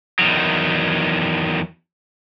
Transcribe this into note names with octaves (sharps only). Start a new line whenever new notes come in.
E2 D#3 F#3